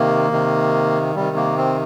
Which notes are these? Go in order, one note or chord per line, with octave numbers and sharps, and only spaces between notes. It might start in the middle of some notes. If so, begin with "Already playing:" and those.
Already playing: C3 D#3 A#3
C3 D#3
C3 D#3 G3
A#3
C4